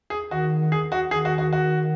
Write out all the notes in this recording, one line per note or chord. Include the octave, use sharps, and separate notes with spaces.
G#4
D#3 F#4
G#4
F#4
D#3 G#4
F#4
F#4
F#4